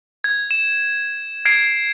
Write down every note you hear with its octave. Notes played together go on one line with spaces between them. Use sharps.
G#6
E7
G#6 C7 D7